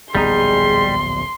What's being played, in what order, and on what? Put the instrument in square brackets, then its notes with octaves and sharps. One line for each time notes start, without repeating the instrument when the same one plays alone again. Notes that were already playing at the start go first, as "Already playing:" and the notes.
[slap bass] D1 A#1 B3 [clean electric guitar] G3 D#4 [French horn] G#4 [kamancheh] C6